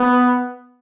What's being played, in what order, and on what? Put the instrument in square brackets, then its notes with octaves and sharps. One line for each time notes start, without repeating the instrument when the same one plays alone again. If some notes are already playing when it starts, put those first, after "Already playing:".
Already playing: [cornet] B3